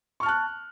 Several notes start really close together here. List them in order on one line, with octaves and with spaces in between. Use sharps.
C#6 F6 A5 F#6